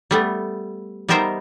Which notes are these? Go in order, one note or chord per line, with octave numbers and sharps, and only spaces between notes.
G3 A3 B3
G3 B3 D#4 A#4 C5 E5